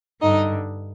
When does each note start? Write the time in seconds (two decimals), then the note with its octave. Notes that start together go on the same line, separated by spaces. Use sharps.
0.21 G2 D3 D#4 D#5